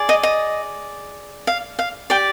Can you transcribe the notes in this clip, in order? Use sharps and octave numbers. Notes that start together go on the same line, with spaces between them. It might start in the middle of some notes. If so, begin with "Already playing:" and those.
Already playing: G#4 D5
D#5
D#5
F5
F5
G4 D5 G5